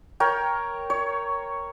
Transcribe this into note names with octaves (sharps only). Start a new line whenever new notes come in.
A#4 C#5 G5
C#5